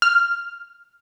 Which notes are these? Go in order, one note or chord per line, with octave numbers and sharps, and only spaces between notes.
F6